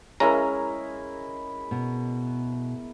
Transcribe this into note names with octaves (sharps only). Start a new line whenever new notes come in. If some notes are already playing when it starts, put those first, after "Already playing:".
G#3 C#4 E4 A#4 A#5
B2